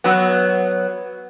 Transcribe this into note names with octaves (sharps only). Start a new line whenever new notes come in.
F#3 B3